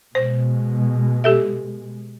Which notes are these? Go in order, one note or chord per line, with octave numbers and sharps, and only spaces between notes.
B2 G#3 C5
G4 A4 E5